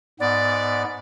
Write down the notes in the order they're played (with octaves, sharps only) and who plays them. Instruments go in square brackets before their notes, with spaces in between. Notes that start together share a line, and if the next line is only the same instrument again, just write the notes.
[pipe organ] G#2 B3 [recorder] D5